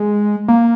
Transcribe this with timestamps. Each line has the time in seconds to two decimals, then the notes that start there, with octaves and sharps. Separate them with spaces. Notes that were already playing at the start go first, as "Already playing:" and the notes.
Already playing: G#3
0.48 A#3